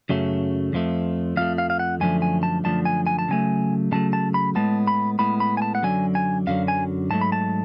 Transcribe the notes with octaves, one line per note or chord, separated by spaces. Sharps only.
F#2 C#3 F#3 A3
F2 F3 A3
F2 F3 A3 F5
F5
F5
F#5
F#2 D3 F3 A3 G#5
G#5
A5
F#2 D3 F3 A3 A5
G#5
G#5
A5
C#3 F#3 A3 G#5
C#3 F#3 A3 A5
A5
B5
A2 G#3 B3 A5
B5
A2 G#3 B3 B5
B5
G#5
A5
F#5
F#2 D3 F#3 G#5
G#5
F#2 D3 F#3 F5
G#5
G#2 F#3 A3 A5
B5
A5